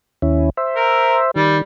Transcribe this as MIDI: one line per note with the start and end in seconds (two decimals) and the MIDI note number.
0.22 0.50 39
0.22 0.50 61
0.22 0.50 64
0.57 1.31 72
0.57 1.31 76
0.76 1.17 70
1.36 1.61 51
1.36 1.57 55